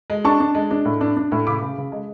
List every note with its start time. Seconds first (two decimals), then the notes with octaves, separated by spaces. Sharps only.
0.10 G#3
0.24 D4 A5 C#6
0.40 D4
0.55 G#3
0.71 D4
0.85 A2
1.01 D4
1.17 D4
1.32 A2
1.47 C#3 B5 D6
1.62 C#3
1.78 C#3
1.92 G#3